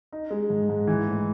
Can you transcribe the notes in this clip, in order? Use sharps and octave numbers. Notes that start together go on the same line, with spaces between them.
D#4
G#3
G#2
G#2
E3
A2